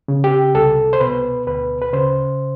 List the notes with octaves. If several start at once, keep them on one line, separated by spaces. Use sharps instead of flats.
C#3
G4
C2 A4
C5
B2 B4
D2 B4
B4
C#3 C5